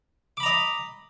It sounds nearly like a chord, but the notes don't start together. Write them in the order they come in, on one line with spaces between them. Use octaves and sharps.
D6 B5 A#5 D#5